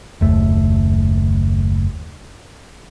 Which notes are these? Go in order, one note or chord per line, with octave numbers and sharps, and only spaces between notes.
F#1 D#2 A3